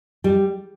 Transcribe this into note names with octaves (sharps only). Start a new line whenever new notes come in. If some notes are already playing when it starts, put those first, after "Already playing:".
G3